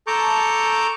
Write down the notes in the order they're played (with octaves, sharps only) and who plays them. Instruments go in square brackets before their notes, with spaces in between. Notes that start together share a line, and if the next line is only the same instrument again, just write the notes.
[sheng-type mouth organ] A4 A5 A#5 C#6 D6 G6